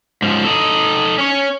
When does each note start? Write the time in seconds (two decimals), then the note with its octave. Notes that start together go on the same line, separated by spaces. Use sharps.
0.22 G#2 F3
0.44 D#4 A4
1.18 C#4 C#5